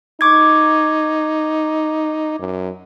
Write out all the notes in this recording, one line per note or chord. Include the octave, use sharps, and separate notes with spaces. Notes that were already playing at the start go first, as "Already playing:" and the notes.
D#4 C#6 D6 G#6
F#2